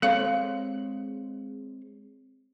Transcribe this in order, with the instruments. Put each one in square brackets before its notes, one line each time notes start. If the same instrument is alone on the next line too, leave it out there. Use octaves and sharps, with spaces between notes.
[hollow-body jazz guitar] G#3 C4 C#5 [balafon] A4 F5